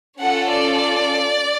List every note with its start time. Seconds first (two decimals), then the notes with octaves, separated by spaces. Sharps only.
0.19 C#4 F4 A4 F#5
0.51 D5